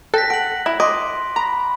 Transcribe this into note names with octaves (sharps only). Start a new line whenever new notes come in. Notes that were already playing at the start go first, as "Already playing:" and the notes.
A4 G5 F#6 A#6 B6
F#5 D7 F#7
E4
D#5 C6 D6 D7
A#5 B5